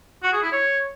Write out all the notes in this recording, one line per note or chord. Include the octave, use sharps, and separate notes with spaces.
F#4
G#4
E4
C#5